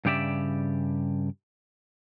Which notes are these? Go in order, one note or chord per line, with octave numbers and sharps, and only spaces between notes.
G2 C#3 G4 D5 E5